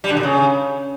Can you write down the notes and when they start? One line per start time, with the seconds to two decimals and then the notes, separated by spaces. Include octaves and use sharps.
0.04 G3
0.10 D3
0.17 A#2
0.23 C#3